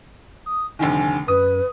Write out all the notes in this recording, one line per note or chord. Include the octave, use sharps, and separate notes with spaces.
D#6
F1 D3 D#3 G#5
F#2 B4 D#6